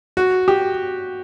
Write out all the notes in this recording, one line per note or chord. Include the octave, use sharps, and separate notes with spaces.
F#4
G4